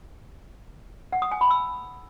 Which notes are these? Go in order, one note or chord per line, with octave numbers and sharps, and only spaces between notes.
F#5
D#6
G#5
B5
E6